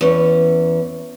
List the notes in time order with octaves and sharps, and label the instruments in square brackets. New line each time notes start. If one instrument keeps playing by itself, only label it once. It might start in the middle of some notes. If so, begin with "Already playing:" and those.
[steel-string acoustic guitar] E2 C#4